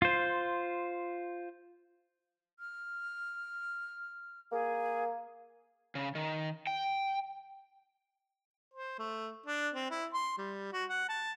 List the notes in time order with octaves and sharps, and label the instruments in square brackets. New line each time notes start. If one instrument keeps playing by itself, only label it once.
[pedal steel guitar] F4 C5
[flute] F6
[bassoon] A#3 [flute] G#4
[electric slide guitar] C#3
D#3
G5
[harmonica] C5
A3
D4
C4
E4
C6
G3
F#4
F#5
A5